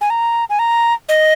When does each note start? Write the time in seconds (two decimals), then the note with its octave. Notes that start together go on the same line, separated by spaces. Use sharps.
0.01 G#5
0.10 A#5
0.50 G#5
0.59 A#5
1.09 D#5